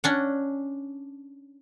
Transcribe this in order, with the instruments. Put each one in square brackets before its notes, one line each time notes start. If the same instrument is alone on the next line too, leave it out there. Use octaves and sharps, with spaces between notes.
[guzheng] C#4 D4 F#5